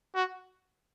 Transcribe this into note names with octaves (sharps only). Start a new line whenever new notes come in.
F#4